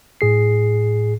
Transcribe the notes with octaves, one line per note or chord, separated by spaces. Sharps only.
A2 G#4 C7